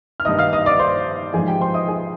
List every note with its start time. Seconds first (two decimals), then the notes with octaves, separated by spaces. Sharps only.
0.20 F6
0.25 G2 D#3 D#5 D#6
0.39 F5 F6
0.53 D#5 D#6
0.66 D5 D6
0.79 C5 C6
1.34 G#2 F3 G#4 G#5
1.47 G4 G5
1.61 C5 C6
1.74 D#5 D#6
1.88 G#4 G#5